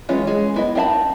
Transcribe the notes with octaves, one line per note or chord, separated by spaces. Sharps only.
E3 G#3 C#4 F4
G#3
B3 E4 D#5
C4 D#4 E5 A5 B5